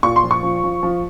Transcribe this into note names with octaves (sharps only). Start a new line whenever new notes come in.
A#2 C#6
C6
F3
C#6
F3
F3
F3